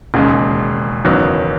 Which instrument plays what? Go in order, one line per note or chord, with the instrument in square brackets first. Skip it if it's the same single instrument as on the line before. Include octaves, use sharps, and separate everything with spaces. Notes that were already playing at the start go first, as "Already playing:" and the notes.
[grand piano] E1 D#2 C#3 G#3
F#1 E2 D#3 F#3